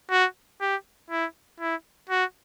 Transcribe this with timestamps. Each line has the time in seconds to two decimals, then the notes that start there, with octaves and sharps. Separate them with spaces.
0.11 F#4
0.61 G4
1.10 E4
1.60 E4
2.10 F#4